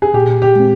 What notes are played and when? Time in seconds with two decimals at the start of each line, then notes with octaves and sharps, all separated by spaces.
0.02 G#4
0.14 A#2 G4
0.42 G4
0.56 G#3 C4